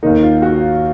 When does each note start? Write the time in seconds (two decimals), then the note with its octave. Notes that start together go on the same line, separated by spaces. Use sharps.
0.03 D#2 D#3 A#3 D#4
0.23 F4
0.42 F#4